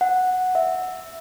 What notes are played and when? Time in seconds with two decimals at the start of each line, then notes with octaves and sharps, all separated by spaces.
0.01 F#5
0.55 E5